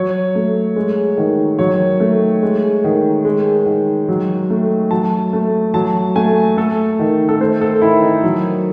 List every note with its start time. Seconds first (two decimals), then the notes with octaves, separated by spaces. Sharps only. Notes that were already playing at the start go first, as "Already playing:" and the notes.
Already playing: F#3 C#5
0.35 A3
0.76 G#3
1.18 D#3
1.59 F#3 C#5
2.00 A3
2.43 G#3
2.84 D#3
3.25 G#3
3.66 D#3
4.08 F#3
4.50 A3
4.91 F#3 A5
5.33 A3
5.74 F#3 A5
6.16 A3 G#5
6.57 A3 A4
6.99 D#3
7.29 A4
7.40 A3 C5
7.61 A4
7.82 D#3 E4
8.02 D#4
8.23 F#3